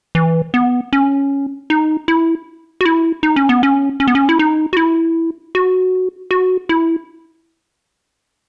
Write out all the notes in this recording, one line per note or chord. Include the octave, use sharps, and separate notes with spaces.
E3
B3
C#4
D#4
E4
F#4
E4
D#4
C#4
B3
C#4
C#4
B3
C#4
E4
D#4
F#4
E4
F#4
F#4
E4